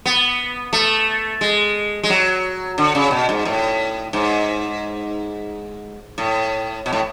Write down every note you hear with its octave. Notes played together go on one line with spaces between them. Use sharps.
B3
A3
G#3
G#3
F#3
D3
C#3
B2
G#2
A2
G#2
A2
B2
A2